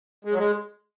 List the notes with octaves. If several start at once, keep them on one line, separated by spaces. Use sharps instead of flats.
G#3
F#3
G#3